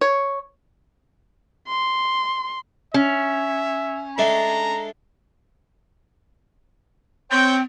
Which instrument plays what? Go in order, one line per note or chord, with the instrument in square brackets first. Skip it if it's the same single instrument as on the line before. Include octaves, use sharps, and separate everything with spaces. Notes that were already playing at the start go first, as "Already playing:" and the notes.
[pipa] C#5
[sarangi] C6
[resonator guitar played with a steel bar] C#4 [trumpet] E5
[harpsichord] G#3 A3 D4 [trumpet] A#5
[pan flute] C4 [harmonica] C5 C#5 G5